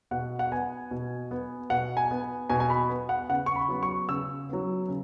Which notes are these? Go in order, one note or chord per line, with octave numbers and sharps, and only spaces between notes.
B2 F#5
F#5
B3 G#5
B2
B3
B2 F#5
G#5
B3
B2 G#5
G#5
B5
B3
F#5
C#3 F#5
C#6
B5
F#3 B3
C#6
C#3 E6
F#3 B3
C#3